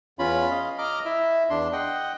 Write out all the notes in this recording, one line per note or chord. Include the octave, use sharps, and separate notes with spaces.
E2 C#4 F4 B5
D#5 F5
D#5 A#5 D6 F6
E4 E5
E2 D4 C6
D#5 F#5 G5